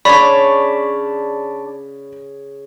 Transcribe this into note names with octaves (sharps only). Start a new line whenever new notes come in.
C#3 D4 C#5 D5 B5